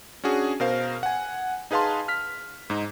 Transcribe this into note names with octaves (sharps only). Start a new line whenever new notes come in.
C#4 D4 F#4 G#4
B2 A#4 C5 F5
F#5 G#5
D#4 G#4 B4 F5 A5 C6
F6 B6
G#2 D#4